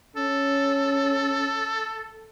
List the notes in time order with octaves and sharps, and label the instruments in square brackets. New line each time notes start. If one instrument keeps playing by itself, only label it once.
[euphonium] C#4 [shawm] A4